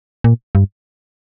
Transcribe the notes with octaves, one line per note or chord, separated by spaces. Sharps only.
A#2
G2